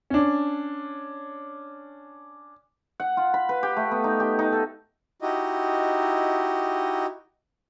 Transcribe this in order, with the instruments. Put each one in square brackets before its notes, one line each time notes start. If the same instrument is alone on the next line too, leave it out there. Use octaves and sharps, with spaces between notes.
[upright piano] C#4 D4
[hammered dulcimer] F#5
F4
B5
B4
G4
A3
B3
D#4
G4
D#4
A4
[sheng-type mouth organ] D#4 E4 F#4 G4 D#5